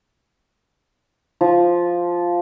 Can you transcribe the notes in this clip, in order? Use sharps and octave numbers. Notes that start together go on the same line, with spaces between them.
F3